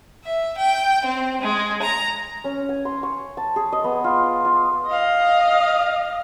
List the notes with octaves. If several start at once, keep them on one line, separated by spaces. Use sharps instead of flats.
E5
G5
C4
G#3
A#5
C#4
G#5
C6
C#6
A5
G#4
D#5
B3
F4
F4
D#5 F5